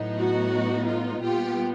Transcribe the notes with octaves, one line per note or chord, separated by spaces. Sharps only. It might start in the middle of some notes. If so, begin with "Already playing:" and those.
Already playing: A2 F#3 B3 D#4
F#4
F4
A#2 G3 B3 F4 G4